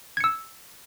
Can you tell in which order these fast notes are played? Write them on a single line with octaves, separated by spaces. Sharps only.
G#6 C#7 E6